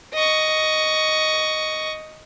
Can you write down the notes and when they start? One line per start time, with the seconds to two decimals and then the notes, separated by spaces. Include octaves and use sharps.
0.14 D#5 C#6